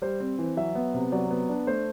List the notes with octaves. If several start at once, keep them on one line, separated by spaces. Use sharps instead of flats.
G3 C5
C4
E3
F#3 E5
B3
C3
F#3 D5
B3
D4
A3 C5